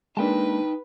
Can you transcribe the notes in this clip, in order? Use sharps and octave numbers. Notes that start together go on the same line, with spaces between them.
G#3 A#3 D4 D#4 B4 G5 A5